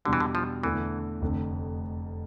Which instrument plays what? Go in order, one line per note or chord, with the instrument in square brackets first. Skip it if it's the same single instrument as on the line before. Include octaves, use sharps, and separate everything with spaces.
[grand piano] E2 B2 G3 D4 [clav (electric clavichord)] D3
[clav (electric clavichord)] E3
D3
F3
[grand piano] E2 D3 A3 D4 [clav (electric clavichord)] E3
[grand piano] F1 F2 D3